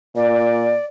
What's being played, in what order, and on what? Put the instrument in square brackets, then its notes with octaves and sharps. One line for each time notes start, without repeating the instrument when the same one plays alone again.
[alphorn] A#2 [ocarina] D5